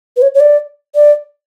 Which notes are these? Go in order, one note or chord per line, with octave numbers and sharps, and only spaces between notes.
B4
C#5
C#5
D5
D5